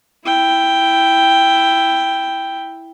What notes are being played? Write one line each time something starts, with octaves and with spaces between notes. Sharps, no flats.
E4 G5